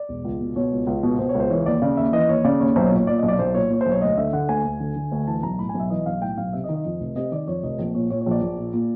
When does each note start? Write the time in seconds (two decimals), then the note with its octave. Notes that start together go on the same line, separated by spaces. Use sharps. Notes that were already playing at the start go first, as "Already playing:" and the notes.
Already playing: D5
0.09 E1
0.25 C#2
0.41 B2
0.56 B2 C#5
0.72 C#2
0.87 C#2
1.03 B2
1.19 B2 C5
1.29 C#5
1.35 C#2
1.40 C5
1.50 E3 C#5
1.66 D#2 D5
1.82 C#3 D5
1.97 D#2 E5
2.13 E3 D#5
2.29 D#2 C#5
2.44 C#3 D5
2.60 D#2 C#5
2.76 B1 C5
2.86 C#5
2.92 A#2
2.97 C#5
3.07 A#2 D5
3.18 B1 D#5
3.28 D5
3.39 B1 C5
3.54 A#2 C#5
3.70 A#2 C#5
3.81 C5
3.86 B1
3.91 C#5
4.01 D2 D#5
4.18 D3 E5
4.33 D3 F#5
4.48 D2 G#5
4.65 D2
4.80 D3
4.96 D3
5.12 D2
5.27 E3 A5
5.43 B1 A#5
5.59 A2 B5
5.69 G#5
5.74 B1
5.80 E5
5.90 E3 D#5
6.06 B1 F5
6.21 A2 G5
6.38 B1 F5
6.53 C3 E5
6.64 D#5
6.69 D#3
6.74 D#5
6.85 F2
7.00 F1
7.16 C3 D#5
7.32 D#3 D5
7.47 F2 C#5
7.63 F1 D#5
7.79 A#1
7.95 A#2 C#5
8.10 A#2 C#5
8.21 C#5
8.26 A#1 D5
8.42 A#1
8.58 A#2
8.73 A#2